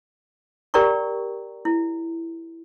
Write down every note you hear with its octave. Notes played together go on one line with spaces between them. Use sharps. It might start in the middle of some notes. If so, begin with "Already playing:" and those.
G4 A#4 D5 G5 A#5 C#6
E4